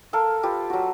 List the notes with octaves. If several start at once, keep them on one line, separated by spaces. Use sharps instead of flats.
A4 A#4 F5
F4 G4 B4
F#3 F#4